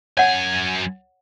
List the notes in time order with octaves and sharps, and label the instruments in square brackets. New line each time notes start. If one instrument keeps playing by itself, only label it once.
[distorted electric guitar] F#2 G#5 [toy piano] C#5 F#5